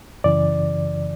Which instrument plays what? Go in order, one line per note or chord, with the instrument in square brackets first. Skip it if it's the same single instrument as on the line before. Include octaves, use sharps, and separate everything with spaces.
[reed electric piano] F#2 C#3 E3 D5